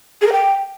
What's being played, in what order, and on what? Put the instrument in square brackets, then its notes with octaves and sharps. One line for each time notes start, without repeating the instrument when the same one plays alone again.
[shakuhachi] G#4
A#4
G5